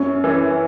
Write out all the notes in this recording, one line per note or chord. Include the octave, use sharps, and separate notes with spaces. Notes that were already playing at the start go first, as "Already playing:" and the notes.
Already playing: F#2 C#4
E3